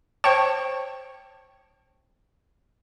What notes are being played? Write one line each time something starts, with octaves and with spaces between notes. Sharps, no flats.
C5 C#5 G5 A5